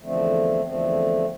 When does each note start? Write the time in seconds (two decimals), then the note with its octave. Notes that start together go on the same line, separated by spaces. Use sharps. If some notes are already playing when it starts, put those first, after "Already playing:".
0.01 E2 D3 F3 A3 C4
0.63 E2 D3 F3 A3 C4